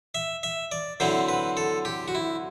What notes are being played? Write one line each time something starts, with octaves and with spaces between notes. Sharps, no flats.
E5
E5
D5
D3 F#3 C4 E4 C5
B4
A4
G4
F#4
E4